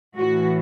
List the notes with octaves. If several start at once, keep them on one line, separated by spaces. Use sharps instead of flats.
A2 E3 F#4